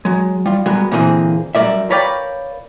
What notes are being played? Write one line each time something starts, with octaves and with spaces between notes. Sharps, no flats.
F#3 G#3
G3 F4
G3 G#3 B3 F#4 A#4
A#2 D3 E3 A#3 C4 G#4
F#2 G3 D4 A#4 D5 E5
A#4 B4 C#5 D5 F5 G5